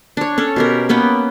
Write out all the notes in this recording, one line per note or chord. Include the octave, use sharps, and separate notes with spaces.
D4 C#5
C#4 A4 C#5
B2 G4 A#4
A#3 B3 C#4 G5